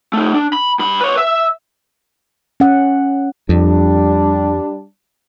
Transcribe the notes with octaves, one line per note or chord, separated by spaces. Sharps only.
A3 D#4
D4
B5
G2 B5
B4 C#5
E5
C#4 F#5
F2 G3 D4